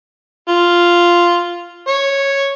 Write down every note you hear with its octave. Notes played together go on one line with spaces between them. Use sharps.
F4
C#5